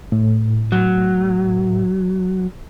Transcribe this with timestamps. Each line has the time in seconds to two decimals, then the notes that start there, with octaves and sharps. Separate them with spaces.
0.12 A2
0.72 F#3